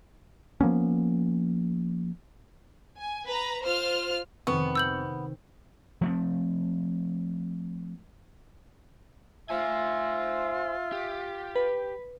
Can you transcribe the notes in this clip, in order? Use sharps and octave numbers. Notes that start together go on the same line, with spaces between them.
F3 A#3 B3 C#4
G#5
B4 A#5
F4 C5 F6
F2 C3 D#3 B3 C#6
E6 G6 F#7
F3 A3 C4
F4 C5 E5 G#5
G4
B4